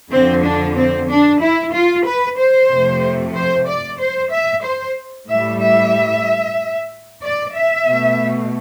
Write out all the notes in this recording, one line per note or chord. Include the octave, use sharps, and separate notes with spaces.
F2 D3 F3 C4
D4
C4
D4
E4
F4
B4
C5
F2 C3 F3 A3
C5
D5
C5
E5
C5
A2 G3 E5
E5
D5
E5
B2 A3